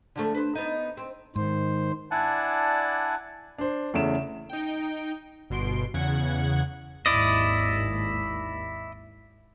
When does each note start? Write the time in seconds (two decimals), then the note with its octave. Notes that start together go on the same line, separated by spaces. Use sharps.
0.16 D3 F3 A3
0.35 B4 C5
0.55 B3 D#4
0.97 C4
1.36 G#2 D#3 C5
2.11 D4 E4 D5 F#5 G#5 A5
3.58 D4 C5
3.94 E2 C#3 A3 E5 D7 E7
4.50 D#4 G5
5.50 G1 B2 C6 D7
5.94 E2 C#3 F#5 G#6
7.06 G#1 D#2 E4 D5 D#5